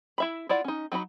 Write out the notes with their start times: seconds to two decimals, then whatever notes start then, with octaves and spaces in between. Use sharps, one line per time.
0.18 E4 E5 B5
0.49 E4 F4 D5 F#5
0.64 C#4 D#4
0.92 F#3 D#4 F#4 B5